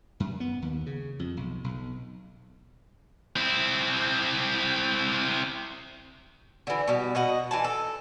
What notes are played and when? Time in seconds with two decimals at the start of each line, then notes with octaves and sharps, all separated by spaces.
0.20 F#2
0.40 B3
0.62 D#2
0.86 C#3
1.19 F2
1.37 B1
1.64 B1
3.36 C4 E4
6.67 D3 E3
6.88 B2 G3
7.15 B2 D#5 F#5
7.51 E3 G#5 A5
7.64 A4